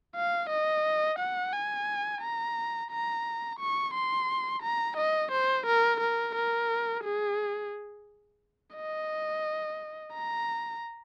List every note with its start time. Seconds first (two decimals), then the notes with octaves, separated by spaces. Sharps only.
0.15 F5
0.49 D#5
1.18 F#5
1.53 G#5
2.21 A#5
2.91 A#5
3.59 C#6
3.94 C6
4.62 A#5
4.97 D#5
5.31 C5
5.66 A#4
6.00 A#4
6.35 A#4
7.03 G#4
8.76 D#5
10.13 A#5